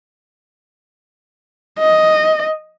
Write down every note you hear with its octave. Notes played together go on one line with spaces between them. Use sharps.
D#5